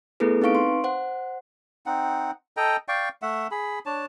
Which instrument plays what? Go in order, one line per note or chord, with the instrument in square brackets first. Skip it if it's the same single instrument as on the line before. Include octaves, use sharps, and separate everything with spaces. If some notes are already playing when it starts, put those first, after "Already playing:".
[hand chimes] A3 B3 E4 G#4 A4 B4
C4 D#4 B4 F5 C#6 D7
C6
C5 F#5
[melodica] C4 D#4 F#5
A4 D#5 G5 A#5
D5 F5 G5 C#6
A3 E5 F#5
G#4 B5
D4 C#5 A5